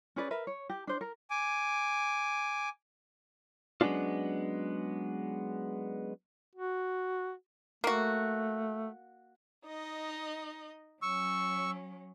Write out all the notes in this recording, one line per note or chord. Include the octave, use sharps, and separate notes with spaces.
C#4 G#4 B4 D5
A#4 B4 E5
C#5
G4
D4 C5
A#4
G#5 D6
F#3 G#3 B3 C#4 D4 F4
F#4
A3 A#3 F#4
D#4 D#5
F#3 C#4 C#6 E6